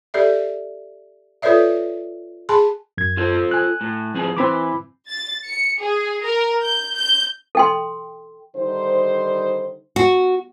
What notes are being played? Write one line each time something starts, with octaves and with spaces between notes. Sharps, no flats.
G4 A4 D5 E5
F4 A4 B4 C#5 D5 E5
G#4 G#5 A5 B5 C6
F#2 G#6
F4 A4 C5
G#5 F#6
A2
F3 C4 G#4
E3 C4 E4 B5 D6
A6
C#7
G#4
A#4
G6
G6
A4 G5 C6
D3 D#3 G3 D#4 C5
F#4